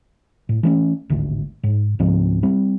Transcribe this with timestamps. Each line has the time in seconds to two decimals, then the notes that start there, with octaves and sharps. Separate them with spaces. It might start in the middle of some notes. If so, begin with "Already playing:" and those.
0.49 A2
0.63 E3 A3 C#4
1.10 D1 G#1 D2
1.63 G#2
1.99 C#2 G#2 F3 C4
2.43 G3 C4